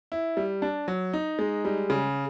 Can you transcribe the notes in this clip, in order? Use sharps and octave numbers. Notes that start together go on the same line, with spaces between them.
E4
G3
D4
F#3
D#4
G#3
G3
C#3